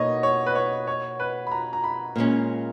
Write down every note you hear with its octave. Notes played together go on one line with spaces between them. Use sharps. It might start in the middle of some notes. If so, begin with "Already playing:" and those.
Already playing: B2 A#3 D#4 C#5 D#5
C#5
B4
C#5
C#5
B4
B5
A#5
A#5
B5
A#2 G#3 C#4